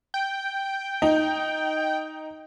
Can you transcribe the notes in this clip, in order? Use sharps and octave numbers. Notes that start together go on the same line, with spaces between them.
G5
D#4